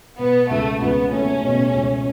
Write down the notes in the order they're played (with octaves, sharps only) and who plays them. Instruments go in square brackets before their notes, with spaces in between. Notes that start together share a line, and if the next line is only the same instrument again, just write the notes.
[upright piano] B2 [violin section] B3
[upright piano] C#2 [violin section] A3
[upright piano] C#2 [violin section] B3
[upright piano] A3 [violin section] C#4
[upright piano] B2
C#2